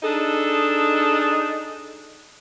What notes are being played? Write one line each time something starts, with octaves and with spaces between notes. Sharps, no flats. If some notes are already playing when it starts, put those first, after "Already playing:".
D4 D#4 G#4 A4